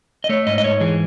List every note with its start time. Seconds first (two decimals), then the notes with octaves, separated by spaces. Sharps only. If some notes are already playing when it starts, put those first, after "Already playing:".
0.24 D#5
0.29 A3 C#5
0.47 G#2 D#5
0.58 D#5
0.63 G#2 C#5
0.80 E3 G#4